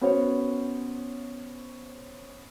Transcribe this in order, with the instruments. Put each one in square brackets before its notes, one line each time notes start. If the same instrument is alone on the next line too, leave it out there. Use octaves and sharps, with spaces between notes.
[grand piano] B3 C#4 F#4 C5 C#5